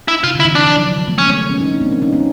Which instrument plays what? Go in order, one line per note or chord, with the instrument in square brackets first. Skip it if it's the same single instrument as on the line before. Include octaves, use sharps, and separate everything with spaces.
[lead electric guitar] E4
[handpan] C3 [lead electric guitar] F4
[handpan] D3
[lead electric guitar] E4
[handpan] E3
[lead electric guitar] D4
[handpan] F3
F#3
F#3
F3
A3 B3
[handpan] G#3 A#3 [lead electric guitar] C#4
[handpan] A3 B3
B3 C#4
C#4 D#4
C4 D4
A#3 C4
B3 C#4
C#4 D#4
B3 C#4